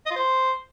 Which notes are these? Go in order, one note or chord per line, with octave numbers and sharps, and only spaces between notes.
D#5
F4
C5